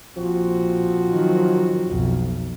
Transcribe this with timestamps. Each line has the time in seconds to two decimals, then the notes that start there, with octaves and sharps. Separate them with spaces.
0.17 A#1 F3 C4 F#4
1.11 D#3 F#3
1.87 B1 F2